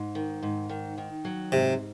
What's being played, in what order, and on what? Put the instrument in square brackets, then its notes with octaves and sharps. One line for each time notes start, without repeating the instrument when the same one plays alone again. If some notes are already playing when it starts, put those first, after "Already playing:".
Already playing: [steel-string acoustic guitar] G#2
D#3
G#2
D#3
D#3
F#3
[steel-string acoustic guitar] G#2 [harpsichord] C3